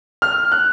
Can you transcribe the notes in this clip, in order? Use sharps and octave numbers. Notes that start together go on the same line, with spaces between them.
F6
F#6